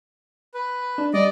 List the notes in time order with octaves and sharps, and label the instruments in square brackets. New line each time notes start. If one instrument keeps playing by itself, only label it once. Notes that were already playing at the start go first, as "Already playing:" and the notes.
[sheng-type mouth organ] B4
[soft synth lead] D4
[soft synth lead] G3 [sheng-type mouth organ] D5 D#5